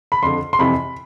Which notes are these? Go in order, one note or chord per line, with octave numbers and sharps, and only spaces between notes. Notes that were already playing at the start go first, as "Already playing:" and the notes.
B5
F2 D3 C6
C6
F2 C3 E3 B5